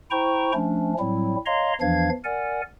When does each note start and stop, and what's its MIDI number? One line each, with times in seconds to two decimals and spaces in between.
0.11 0.52 64
0.11 0.52 72
0.11 0.52 79
0.11 0.52 82
0.11 0.52 85
0.54 0.94 53
0.54 0.94 57
0.54 0.94 61
0.54 0.94 62
0.99 1.36 45
0.99 1.36 54
0.99 1.36 55
0.99 1.36 60
0.99 1.36 64
1.46 1.73 73
1.46 1.73 75
1.46 1.73 77
1.46 1.73 82
1.46 1.73 84
1.81 2.09 40
1.81 2.09 52
1.81 2.09 53
1.81 2.09 62
1.81 2.09 77
1.81 2.09 92
2.24 2.61 70
2.24 2.61 74
2.24 2.61 78
2.24 2.61 80